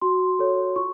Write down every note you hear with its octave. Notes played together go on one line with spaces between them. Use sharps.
F#4 C6
A4 C#5
F4 C#6